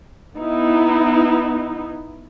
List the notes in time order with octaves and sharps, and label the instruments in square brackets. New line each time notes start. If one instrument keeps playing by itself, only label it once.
[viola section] B3 D#4 E4